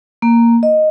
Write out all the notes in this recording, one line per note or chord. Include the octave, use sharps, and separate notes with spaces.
A#3
D#5